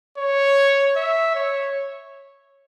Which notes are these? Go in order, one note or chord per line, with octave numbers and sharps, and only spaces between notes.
C#5
E5
C#5